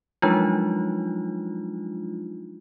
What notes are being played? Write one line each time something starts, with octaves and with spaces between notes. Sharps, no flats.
F3 F#3 G#3 D4 D#4 F4